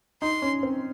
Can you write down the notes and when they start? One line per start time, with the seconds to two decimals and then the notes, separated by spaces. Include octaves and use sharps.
0.22 D#4 C6
0.42 C#4
0.63 C4